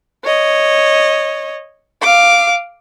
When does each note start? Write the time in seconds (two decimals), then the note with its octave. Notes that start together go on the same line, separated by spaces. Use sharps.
0.24 C#5 D#5
2.01 F5 D6